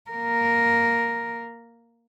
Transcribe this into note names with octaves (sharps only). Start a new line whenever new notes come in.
A#3 A#4